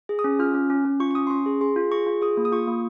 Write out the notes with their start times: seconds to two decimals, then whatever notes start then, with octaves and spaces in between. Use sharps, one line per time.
0.09 G#4
0.19 D#6
0.24 C#4
0.39 F4 F6
0.54 C#4
0.70 C#4
0.85 C#4
1.00 F4 C#6
1.11 C#6
1.15 C#4 D#6
1.27 C6
1.30 C#4 C#6
1.46 G#4
1.61 G#4 C6
1.76 F4
1.92 G#4 C#6
2.07 F4
2.22 G#4 D#6
2.37 A#3
2.45 D#6
2.52 F4 C#6
2.67 A#3